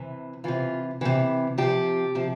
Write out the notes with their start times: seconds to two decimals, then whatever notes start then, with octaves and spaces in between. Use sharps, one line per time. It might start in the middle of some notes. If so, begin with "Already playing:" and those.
Already playing: C3 E3
0.44 C3 E3 F4
1.01 C3 E3
1.58 C3 F3 G4
2.15 C3 F3